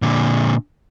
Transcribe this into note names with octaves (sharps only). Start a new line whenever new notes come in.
A#2 D3